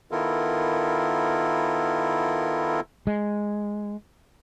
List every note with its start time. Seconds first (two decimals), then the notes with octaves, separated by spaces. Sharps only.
0.11 D#3 B3 E4 F4 A4 A#4
3.07 G#3